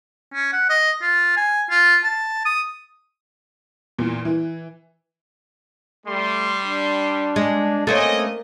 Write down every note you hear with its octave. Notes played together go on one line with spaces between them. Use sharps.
C#4
F#5
D#5
F4
G#5
F4
A5
D#6
E2 A#2
E3
G3 A3 C6
D4
G#3
A3 A#3 C4 C#4 D#5 G#5